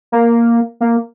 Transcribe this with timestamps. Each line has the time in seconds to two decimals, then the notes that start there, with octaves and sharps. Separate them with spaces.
0.12 A#3
0.81 A#3